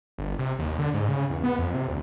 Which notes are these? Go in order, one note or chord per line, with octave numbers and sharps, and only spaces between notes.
G1
C3
D#2
D3
G#2
C#3
E2
B3
F2
C3
D2